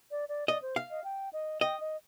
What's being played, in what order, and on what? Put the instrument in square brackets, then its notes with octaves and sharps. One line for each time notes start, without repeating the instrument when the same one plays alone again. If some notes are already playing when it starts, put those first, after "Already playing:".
[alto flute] D5
D5
[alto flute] D5 [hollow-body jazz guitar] D#5
[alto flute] C5
[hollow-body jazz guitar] F5
[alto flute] D#5
G5
D#5
[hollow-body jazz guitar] D#5 [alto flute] G5
[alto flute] D#5